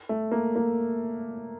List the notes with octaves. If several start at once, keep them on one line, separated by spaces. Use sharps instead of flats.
A3
A#3
A#3